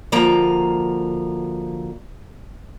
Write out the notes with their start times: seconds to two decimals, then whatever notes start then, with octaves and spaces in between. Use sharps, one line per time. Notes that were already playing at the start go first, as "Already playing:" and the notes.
0.12 D2 F3 A#3 A#5